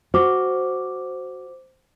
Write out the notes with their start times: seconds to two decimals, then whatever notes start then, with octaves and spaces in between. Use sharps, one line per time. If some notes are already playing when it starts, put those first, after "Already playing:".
0.14 F#4 C5 D6